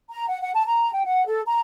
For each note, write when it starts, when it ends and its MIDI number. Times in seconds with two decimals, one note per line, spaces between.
0.10 0.27 82
0.28 0.39 78
0.42 0.51 78
0.54 0.62 81
0.66 0.90 82
0.92 1.03 79
1.05 1.25 78
1.27 1.41 69
1.46 1.59 82